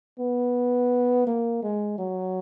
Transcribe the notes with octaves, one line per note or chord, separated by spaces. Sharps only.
B3
A#3
G#3
F#3